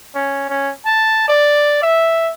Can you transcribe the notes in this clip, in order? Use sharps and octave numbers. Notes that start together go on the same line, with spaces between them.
C#4
C#4
A5
D5
E5